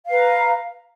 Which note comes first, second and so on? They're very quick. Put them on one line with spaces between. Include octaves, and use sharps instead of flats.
F5 B4 A#5